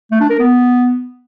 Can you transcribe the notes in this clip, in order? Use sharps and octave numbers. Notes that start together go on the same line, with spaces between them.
A3
D4
A#4
B3